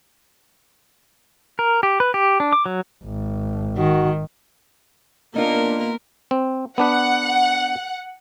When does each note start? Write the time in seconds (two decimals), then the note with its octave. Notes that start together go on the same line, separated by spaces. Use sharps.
1.59 A#4
1.83 G4
2.00 B4
2.14 G4
2.40 D4
2.53 D6
2.66 F#3
3.03 G#1
3.77 D#3 D#4 F#4
5.36 A#3 B3 D4 D#4 F4 A#4
6.31 C4
6.78 B3 D4 B4 F#5